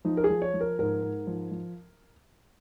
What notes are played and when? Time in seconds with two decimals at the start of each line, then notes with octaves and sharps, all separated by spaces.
0.05 F3 D#4
0.17 A#4
0.24 G#4
0.30 F3
0.42 C#5
0.54 F3
0.61 A#4
0.79 G#2 A#4
1.02 G#2
1.27 F3
1.51 F3